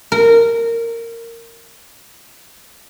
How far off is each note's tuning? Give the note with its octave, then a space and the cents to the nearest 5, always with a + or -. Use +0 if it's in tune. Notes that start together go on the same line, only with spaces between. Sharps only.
A#4 -15